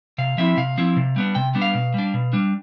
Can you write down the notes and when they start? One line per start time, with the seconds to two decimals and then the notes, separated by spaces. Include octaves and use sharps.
0.18 C3 F5
0.38 F3 C4 E4 E5
0.57 C3 F5
0.78 F3 C4 E4
0.96 C3
1.16 G3 B3 D4
1.35 C3 G5
1.55 G3 B3 D4
1.62 F5
1.75 B2
1.94 G3 D4
2.14 B2
2.33 G3 D4